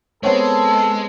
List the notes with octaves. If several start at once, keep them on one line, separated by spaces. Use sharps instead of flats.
G#3 B3 C4 A4 C#5